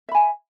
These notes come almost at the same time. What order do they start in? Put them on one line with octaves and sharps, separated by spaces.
E5 B5 G#5